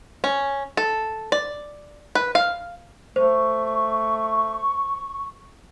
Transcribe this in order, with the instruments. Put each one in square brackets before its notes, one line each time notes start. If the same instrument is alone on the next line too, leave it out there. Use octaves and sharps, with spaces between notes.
[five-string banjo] C#4
A4
D5
B4
F5
[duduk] A3 [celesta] C5 [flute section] C#6